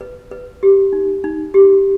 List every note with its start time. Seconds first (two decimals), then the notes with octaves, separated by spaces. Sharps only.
0.01 B4
0.31 B4
0.63 G4
0.93 D#4
1.24 D#4
1.54 G4